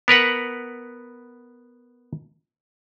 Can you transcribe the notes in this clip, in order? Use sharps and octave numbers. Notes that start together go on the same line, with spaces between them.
B3 A#4 B4 F#5